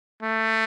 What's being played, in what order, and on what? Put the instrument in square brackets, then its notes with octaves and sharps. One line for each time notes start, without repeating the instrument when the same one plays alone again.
[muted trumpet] A3